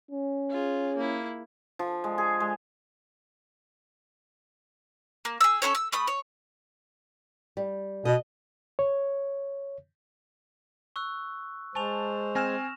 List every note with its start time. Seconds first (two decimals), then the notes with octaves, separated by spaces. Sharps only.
0.11 C#4
0.49 F4 G#4
0.96 A#3 E4
1.79 F3
2.04 G#3
2.18 G#4
2.40 G#3
5.25 A#3
5.41 G#4 E6
5.62 C#4 E4 A4 C#5
5.75 E6
5.92 A3 B5 D#6
6.07 C#5
7.57 G3
8.05 B2 D#5
8.79 C#5
10.96 C#6 E6 F#6
11.75 G#3 C5 G#5 A5 C#6 F7
12.35 C4 G#5 F6 A#6 E7